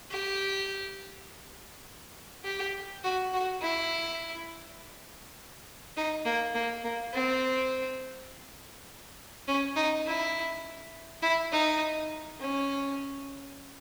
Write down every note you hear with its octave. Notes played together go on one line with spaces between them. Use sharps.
G4
G4
F#4
F#4
E4
D#4
A#3
A#3
A#3
C4
C#4
D#4
E4
E4
D#4
C#4